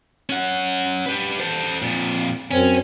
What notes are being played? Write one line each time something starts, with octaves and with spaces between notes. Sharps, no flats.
C#4 F#5
G4 B4
A4 C5
F2 A#2
F#2 C4 C#4 G#5